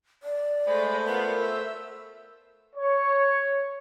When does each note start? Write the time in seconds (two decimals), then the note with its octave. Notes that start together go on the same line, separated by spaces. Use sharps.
0.23 D5
0.67 G#3 A3 C5 B5
1.06 B3 F4 A#4
1.38 E5
2.75 C#5